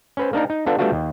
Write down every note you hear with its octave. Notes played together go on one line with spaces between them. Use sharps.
C#4 B4 C5
A#3 D4 D#4 A#4
D#4
B3 D4 F4 A4
G3 A3 B3 D4 F4 F#4
D#2